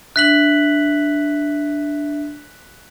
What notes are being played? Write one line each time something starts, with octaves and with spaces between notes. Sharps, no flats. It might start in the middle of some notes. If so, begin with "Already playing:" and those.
D4 E5 F#6 B6 F#7